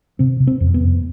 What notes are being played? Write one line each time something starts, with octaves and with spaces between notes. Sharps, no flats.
C3 C4
C3
C4
F2
B3
F2